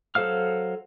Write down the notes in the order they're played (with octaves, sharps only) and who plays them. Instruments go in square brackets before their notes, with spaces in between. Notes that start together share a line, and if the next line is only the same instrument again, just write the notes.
[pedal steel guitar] F#3 A4 C5 F5 F6